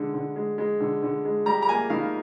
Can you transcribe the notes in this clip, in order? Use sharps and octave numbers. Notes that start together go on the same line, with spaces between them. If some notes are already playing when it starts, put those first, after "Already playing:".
Already playing: D3 G#3
D3
G#3
G#3
D3
D3
G#3
G3 A#5
A#5
A#3 G#5
D#3 F5